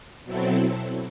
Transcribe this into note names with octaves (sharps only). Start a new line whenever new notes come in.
B2 F#3 C4 E4 A4